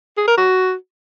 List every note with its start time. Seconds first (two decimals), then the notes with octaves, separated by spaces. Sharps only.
0.17 G#4
0.28 A#4
0.38 F#4